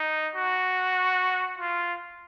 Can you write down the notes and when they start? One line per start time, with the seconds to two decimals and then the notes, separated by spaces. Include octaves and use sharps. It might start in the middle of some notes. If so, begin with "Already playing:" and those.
Already playing: D#4
0.36 F#4
1.58 F4